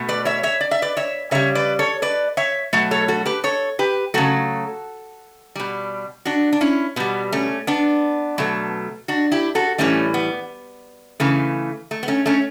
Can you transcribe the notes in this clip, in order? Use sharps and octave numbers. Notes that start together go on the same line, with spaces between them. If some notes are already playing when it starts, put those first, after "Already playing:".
Already playing: B2 A3
B4 D5
C#5 E5
C#5 E5
D5
E5
B4 D5
C#5 E5
C#3 G3 C#5 E5
B4 D5
A4 C#5
B4 D5
C#5 E5
B2 F#3 A3
A4 C#5
F#4 A4
G4 B4
A4 C#5
G4 B4
C#3 F#3 A3 F#4 A4
B2 G3
D4 F#4
D4
C#4 E4
B2 G3 B3
A3 C#4
B3 D4
B2 F#3 A3
D4 F#4
E4 G4
F#4 A4
A2 E3 G3 A3 C#4
B3
C#3 E3 A3
A3
B3
A3 C#4
A3 C#4